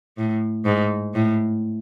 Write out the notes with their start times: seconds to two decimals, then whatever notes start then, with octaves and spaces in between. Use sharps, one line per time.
0.18 A2
0.65 G#2
1.14 A2